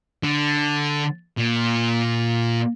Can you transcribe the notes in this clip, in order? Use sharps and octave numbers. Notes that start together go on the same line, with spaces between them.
D3
A#2